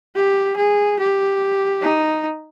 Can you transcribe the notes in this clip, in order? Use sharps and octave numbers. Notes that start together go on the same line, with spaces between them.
G4
G#4
G4
D#4